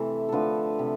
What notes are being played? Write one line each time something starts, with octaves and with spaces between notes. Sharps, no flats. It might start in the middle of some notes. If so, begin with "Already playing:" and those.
Already playing: C3 E3 A3 A4
D3 F3 A3 A4 B4
C3